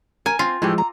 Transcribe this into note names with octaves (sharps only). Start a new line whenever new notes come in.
A#4 G#5
C4 F4
A2 E3 F3 G#3 G4
A#5